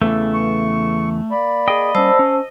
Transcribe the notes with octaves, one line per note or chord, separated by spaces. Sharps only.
E2 C#3 E3 A3
C#6
A#3 D5 B5
G#4 D#5 G5
G3 C#4 C5 A5 E6
C#4